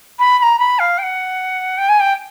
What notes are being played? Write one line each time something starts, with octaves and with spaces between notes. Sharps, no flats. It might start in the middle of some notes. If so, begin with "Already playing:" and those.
B5
B5
A#5
B5
F5
G5
F#5
G5
G#5
G5